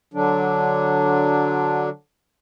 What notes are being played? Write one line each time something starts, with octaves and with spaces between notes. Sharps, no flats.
D3 F#3 D4